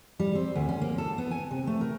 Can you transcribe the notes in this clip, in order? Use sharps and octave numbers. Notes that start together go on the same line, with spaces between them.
G3
C4
D2
C#4
A#3
A4
B3
G#5
C3
A3
A#4